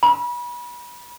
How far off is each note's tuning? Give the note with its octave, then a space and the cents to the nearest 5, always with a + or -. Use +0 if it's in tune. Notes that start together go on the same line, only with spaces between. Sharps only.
B5 -30